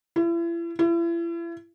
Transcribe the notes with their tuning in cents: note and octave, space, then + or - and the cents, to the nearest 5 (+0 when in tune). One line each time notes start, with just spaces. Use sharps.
E4 +40
E4 +40